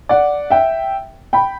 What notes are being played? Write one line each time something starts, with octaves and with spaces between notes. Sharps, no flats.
D5 F#5
E5 G5
G5 B5